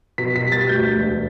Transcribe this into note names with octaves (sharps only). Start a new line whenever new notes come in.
B2 B6
B6
G3
A6
D2 G6
E1